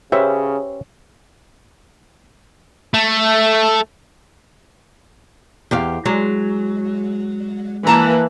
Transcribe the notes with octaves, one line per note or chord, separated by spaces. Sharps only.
C#3 C#4 G4 B4 C5 E5
A3
E2 G4 F5
F#3 G#3
E3 A#3 B4 A5 A#5